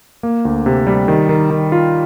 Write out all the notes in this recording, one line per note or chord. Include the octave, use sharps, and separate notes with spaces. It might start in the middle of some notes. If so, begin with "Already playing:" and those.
A#3
D2
C3
G3
D#3
D#3
D#3
F4